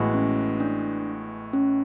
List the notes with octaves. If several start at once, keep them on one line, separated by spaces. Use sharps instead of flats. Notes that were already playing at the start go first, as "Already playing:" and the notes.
Already playing: A1 A2 G#3 B3 F#4
C#4
D4
C#4